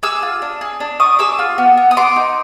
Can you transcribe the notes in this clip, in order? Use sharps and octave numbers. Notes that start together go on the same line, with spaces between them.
G#4 D6 E6
F4
D4
G#4
D4
D4 C#6 D#6
G#4 D6 E6
F4
B3
B3
D#6
B3 C6 D6
D#4